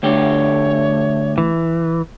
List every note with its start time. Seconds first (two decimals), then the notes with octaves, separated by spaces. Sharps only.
0.03 D2 D3 A3 G4 C#5
1.38 E3